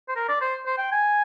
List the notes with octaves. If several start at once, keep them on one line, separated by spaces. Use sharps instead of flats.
C5
A#4
D5
C5
C5
G5
G#5